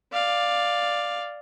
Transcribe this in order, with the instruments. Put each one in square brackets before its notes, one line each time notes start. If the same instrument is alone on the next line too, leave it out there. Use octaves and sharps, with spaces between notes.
[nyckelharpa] D5 F5